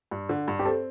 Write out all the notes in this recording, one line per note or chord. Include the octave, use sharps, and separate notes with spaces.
G2
D3
G2
G4
C4 A4